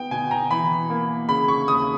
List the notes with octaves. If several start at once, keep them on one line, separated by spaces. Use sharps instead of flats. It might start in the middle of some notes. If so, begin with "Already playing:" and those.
Already playing: B3 G5
B2 G#5
A#5
E3 B5
A#3
C#3 B5
C#6
D#2 D#6